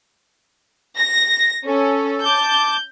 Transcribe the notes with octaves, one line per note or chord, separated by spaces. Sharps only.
A#6
C#4 A4
A5 D6 G6